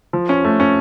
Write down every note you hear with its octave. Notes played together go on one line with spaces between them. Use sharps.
F3
C#4
A3
C#4